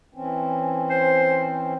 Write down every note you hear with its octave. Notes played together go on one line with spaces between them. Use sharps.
E3 C4 C#4
C5